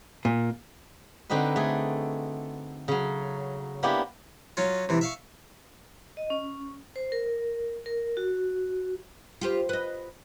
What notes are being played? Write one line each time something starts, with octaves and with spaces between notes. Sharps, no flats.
A#2
D3 C4 D#4 F#4 B4
A3 G#4
C#3 F#3
A#3 B3 C#4 D4 E4 G4
F#3 C#4 F4
C3 E3
E5 F5 C#6
D#5
C#4
C5
A#4
A#4
F#4
F4 G4 C5
B4 D#5